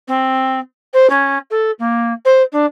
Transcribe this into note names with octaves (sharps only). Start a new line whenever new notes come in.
C4
C5
C#4
A4
A#3
C5
D4